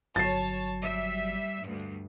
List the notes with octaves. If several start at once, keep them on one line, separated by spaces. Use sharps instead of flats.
G1 F#3 C#5 A5 A6 C7
G3 E5
D2 G2